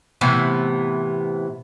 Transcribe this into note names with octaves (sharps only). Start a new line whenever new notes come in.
A2 C3 E3 B3